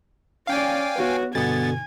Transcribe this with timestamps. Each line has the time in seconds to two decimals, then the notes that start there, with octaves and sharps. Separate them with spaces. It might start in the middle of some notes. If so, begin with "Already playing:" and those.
0.47 C#4 D5 F5 G5 G#5
0.96 B3 F#4 B4 C#5
1.35 G2 B2 D3 B3 G#5 A6